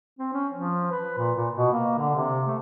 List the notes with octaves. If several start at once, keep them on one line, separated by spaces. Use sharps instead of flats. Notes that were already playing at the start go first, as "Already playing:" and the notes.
C4
C#4
F3
B4
A#2
A#2
B2
A#3
D3
C3
A3